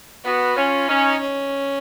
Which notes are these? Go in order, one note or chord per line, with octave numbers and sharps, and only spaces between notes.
B3 F#4
C#4 F4
C#4 D#4
C#4